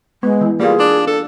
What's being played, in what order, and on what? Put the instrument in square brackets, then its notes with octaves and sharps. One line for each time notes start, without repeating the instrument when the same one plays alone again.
[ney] G#3 [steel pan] B3
[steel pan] E3
[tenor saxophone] G3 [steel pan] A#3 F4 [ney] G#4
[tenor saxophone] D4
[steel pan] D4 [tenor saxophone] A4